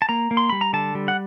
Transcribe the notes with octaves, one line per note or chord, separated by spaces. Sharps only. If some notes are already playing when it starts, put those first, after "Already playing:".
A5
A#3 A#5
A#3
C6
G3 B5
A#5
D3 A5
G3
F#5